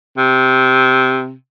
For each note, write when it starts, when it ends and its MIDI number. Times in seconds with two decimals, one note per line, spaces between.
0.17 1.33 48